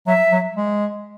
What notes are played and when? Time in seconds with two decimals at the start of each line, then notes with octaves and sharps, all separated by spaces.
0.07 F#3 E5
0.32 F#3
0.56 G#3